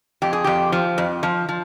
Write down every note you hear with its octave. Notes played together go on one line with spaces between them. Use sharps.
F2 G4
G#4
F2 G4
F3
F2
F3
F3